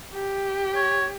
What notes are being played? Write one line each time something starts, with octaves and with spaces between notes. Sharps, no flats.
G4
C#5